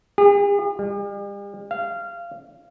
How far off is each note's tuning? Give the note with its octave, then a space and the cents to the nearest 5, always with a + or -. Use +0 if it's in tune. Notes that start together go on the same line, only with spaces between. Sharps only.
G#4 -45
G3 +45
F5 -20